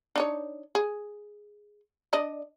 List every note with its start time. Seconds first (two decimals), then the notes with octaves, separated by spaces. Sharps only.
0.16 D4 D#4 C#5
0.75 G#4
2.13 D4 D5 D#5